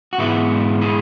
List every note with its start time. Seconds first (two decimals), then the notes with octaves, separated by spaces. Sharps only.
0.13 F#4
0.18 G#2 E3 G#3 B3 E4
0.81 E4 G#4